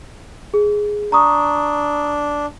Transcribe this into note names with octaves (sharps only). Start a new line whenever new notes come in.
G#4
D4 A#5 C#6 D#6